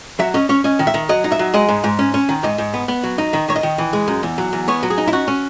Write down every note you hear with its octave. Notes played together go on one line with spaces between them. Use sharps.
F#3 E5
C#4 D#5
C#4 C#5
C#4 D#5
D#3
E5
D#3
F#3 D#5
D#4
E5
F#3
G#3 D#5
G#2
G#2
C#4
C#4
D#3
G#2 D#5
G#2
B3
B3
F#3
D#4
D#3
D#3 C#5
D#5
D#3
E3
G#3
F#2
E2
F#3
E2
B3 C#5
F#3
G#4
D#4
E4
C#4 F#4
C#4